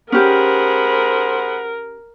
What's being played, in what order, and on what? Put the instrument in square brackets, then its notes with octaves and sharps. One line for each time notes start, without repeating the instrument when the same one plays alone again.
[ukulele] C#4 G4 [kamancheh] G#4 B5 [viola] A#4 [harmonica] C5 F#5